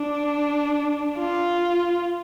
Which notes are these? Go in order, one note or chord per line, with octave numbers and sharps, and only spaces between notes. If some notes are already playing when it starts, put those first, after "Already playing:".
Already playing: D4
F4